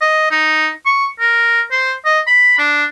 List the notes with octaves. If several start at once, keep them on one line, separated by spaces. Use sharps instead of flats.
D#5
D#4
C#6
A#4
C5
D#5
B5
D4